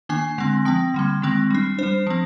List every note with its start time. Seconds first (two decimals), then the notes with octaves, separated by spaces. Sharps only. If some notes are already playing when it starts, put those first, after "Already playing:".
0.09 D#3 A#3 D4 G#5
0.38 D3 G#3 C4
0.65 F3 C4 G5
0.94 D3 G3 A#3
1.22 D#3 G#3 C4
1.50 G3 D4
1.79 G3 D4 C5
2.07 F3 C4